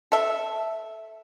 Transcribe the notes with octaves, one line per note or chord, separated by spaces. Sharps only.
A4 E5